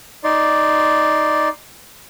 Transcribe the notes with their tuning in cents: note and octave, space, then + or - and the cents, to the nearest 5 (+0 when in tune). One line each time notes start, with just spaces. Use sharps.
D#4 +0 D5 +0 C6 +0